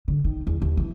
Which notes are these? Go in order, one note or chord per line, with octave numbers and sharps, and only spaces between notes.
D3
D#3
E2
D#2
E3